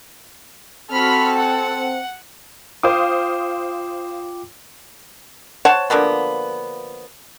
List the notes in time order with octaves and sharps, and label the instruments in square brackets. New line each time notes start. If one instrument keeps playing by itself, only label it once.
[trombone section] C4 [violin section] F#4 B5 F6 [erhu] A4
[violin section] F#5
[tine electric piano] F4 G5 D6 [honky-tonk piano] C5 F5 D#6
[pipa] C5 C#5 F#5 A5
D3 F3 A#3 B3